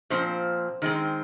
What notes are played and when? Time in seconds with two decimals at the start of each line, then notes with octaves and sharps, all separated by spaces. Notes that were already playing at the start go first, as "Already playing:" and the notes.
0.10 A#2 F3 C4 C5
0.82 D#3 G#3 C4